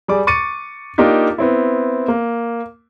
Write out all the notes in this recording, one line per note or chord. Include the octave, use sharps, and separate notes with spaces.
G3 G#4 D5 D6
C#6 D6 A6 C#7 D#7
A#3 D4 D#4 F4 G4
B3 C4 E4
A#3